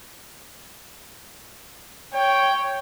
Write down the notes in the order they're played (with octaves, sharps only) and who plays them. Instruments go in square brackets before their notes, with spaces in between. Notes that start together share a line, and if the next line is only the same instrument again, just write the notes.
[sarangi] C#5 [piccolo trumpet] G5